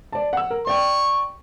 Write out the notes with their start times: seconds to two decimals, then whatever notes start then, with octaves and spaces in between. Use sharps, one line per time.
0.13 D5 A5
0.33 F#5 E6
0.50 A#4
0.67 D5 G5 C#6